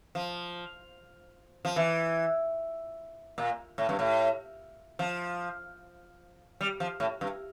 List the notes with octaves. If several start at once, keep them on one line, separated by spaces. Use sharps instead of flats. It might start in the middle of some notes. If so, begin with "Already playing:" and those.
F3
F3
E3
A#2
A2
G2
A2
F3
G3
F3
A2
G2